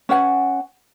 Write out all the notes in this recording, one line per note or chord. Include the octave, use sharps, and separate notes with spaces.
C#4 B4 F#5 G#5